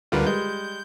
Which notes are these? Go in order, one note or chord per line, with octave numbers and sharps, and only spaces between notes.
D2 D3 G3 F4 A#4 B4
G3 G#3 G6